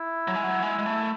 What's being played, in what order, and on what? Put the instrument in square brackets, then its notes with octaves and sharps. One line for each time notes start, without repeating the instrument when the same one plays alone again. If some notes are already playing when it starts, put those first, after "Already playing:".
Already playing: [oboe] E4
[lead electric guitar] F#3
G#3
F#3
G#3
G#3
A3